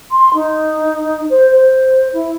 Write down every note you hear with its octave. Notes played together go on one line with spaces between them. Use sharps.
C6
D#4
C5
C5
E4